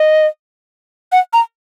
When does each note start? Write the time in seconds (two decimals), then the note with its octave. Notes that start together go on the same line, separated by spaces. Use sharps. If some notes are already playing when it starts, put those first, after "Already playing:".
Already playing: D#5
1.12 F#5
1.33 A#5